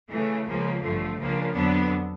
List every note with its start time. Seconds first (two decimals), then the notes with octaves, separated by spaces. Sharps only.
0.10 C#3 E3 A3
0.46 C#2 C#3 F3 A#3
0.82 A1 G2 D3 F3 A3
1.18 C#2 C#3 F3 A#3 D4
1.54 F2 D3 F#3 B3 D4